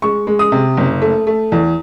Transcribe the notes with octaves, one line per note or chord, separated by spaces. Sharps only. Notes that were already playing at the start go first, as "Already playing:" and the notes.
G#3 C#6
G#3
D#6
C3
F#1
A3
A3
E2